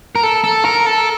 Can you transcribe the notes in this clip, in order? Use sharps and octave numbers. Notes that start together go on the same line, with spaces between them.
A#4
A4
A4
A#4
A4